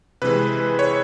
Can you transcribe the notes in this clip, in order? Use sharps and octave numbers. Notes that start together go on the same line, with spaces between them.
C3 E3 G#3 B4
C#5